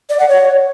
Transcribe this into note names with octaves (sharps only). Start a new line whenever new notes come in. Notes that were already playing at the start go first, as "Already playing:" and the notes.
D5
F#5
C#5